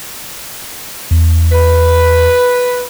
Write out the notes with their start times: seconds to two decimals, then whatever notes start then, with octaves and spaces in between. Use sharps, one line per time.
1.11 E2
1.52 B4